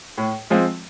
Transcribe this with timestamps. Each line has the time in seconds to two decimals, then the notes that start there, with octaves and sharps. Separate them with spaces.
0.18 A2
0.50 F3 G#3 C4